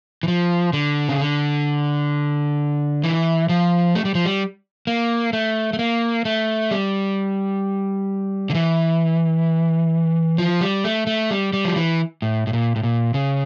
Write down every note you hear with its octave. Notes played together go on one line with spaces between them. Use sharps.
E3
F3
D3
C#3
D3
E3
F3
A3
G3
F3
G3
A#3
A3
A3
A#3
A3
G3
D3
E3
F3
G3
A3
A3
G3
G3
F3
E3
A2
A2
A#2
A2
A#2
C#3